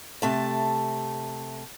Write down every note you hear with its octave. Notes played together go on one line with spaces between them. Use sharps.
C3 A3 A5